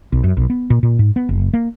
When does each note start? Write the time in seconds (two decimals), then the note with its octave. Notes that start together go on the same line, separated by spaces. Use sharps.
0.12 B1
0.24 F#2
0.37 B1
0.50 B3
0.70 A#2
0.83 A#2
0.99 G#2
1.16 B3
1.29 F#1
1.54 A#3